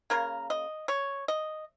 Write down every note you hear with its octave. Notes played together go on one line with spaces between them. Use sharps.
C#3 A#3 A#4
D#5
C#5
D#5